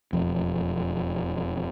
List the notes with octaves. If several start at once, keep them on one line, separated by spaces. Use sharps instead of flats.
E1 F2